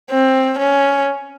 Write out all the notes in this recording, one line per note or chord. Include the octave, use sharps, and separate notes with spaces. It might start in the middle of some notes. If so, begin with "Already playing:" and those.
C4
C#4